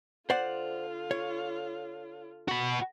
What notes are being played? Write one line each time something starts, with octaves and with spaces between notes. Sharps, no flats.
D3 F4 C5 D5 F#5
C#5
F#4 B5